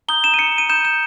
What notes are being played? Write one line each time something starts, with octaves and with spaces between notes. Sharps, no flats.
A#5 D#6 G6 G7
E7
D#7
C#7
D#7
B5 D#6 G6 E7
E7